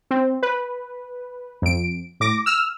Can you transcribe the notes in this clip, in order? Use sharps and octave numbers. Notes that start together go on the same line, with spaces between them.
C4
B4
F2 D7
A2 D6 A#6
E6 F6